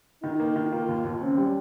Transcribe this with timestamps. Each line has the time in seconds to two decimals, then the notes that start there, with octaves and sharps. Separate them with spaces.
0.23 D#3 D#4
0.40 A#3
0.56 D#3
0.72 A#3 F4
0.88 D#2
1.04 D#2
1.21 C4 C#4
1.37 G3